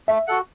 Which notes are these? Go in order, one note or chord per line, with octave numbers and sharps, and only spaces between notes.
A3 E5
F#4 A4 F#5